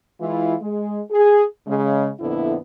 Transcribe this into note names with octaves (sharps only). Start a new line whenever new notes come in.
E3 G#3 E4 F4
G#3
G#4
C#3 G#3
F2 A#2 D3 B3 E4